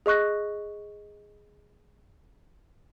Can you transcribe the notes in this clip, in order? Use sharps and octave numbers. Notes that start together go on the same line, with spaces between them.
G#4 D#5 C#6 F#6 A#6